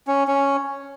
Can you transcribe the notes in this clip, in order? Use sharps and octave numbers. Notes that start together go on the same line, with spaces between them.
C#4
C#4